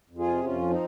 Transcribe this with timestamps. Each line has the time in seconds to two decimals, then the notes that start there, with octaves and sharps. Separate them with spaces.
0.10 F2
0.18 F4 G#4
0.27 C3
0.44 F2 C#4 F4
0.62 F3
0.70 C4 D#4